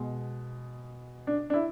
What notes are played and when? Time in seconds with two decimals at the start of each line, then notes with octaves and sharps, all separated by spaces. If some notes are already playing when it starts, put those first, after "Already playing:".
Already playing: B2 G#3
1.27 D4
1.50 D4
1.54 E4